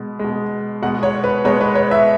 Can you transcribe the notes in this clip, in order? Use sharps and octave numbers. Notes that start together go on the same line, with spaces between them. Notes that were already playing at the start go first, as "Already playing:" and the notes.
Already playing: B2 G#3
B2 G#3
B2 G#3 F#5
C#5
B4
B2 G#3 C#5
B4
C#5
E5